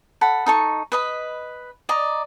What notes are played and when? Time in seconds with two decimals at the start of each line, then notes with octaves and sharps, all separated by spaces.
0.21 A4 F#5 B5
0.46 D#4 A4 C#6
0.92 B4 D#5 B5
1.89 D5 D#5 A#5